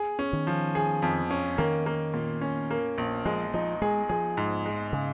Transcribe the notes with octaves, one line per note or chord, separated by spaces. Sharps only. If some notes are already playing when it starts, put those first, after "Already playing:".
Already playing: G#4
C#4
D#3
F3
G#4
F2
C#4
D#3 A#3
A#3
A#2
C#4
A#3
A#1
F3 G#3
F3 D#4
G#3 G#4
F3 G#4
G#2
G#3
C#3